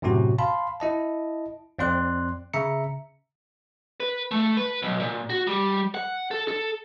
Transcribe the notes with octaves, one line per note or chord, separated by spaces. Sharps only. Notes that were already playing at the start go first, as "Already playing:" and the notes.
F#2 A2 C3 C#4 F#4
F5 A5 B5 C6
E4 D#5 A5
F2 C4 D5 C6 F#6
C#3 E5 A#5 C#7
B4
A3
B4
B1
A#2
F#4
G3
F#5
A4
A4